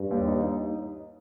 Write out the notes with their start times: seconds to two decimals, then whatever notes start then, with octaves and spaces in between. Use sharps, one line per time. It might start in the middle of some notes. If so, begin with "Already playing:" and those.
Already playing: G2
0.11 D#2
0.28 D#4
0.44 D#4